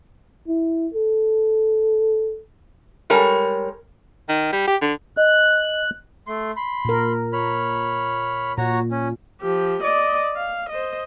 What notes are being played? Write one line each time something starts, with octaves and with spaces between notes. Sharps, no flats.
E4
A4
G3 G#3 A#4 C#5
D#3
G3
G4
D3
D#5 F#6
A3 C6
B5 C6
A#2 A#4
C#5 B5 F6
A#2 F#4 C#5 A#5
C#4
F3 G4
D5 D#5
F5
C5 D#5